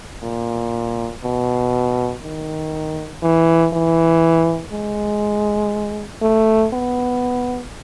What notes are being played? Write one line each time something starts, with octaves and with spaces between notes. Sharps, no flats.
A#2
B2
D#3
E3
E3
G#3
A3
B3